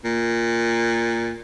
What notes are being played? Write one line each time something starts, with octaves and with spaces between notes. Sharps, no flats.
A#2